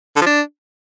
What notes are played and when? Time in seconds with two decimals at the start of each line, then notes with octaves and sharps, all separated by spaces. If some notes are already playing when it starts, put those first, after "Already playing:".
0.16 D3
0.21 F3
0.27 D4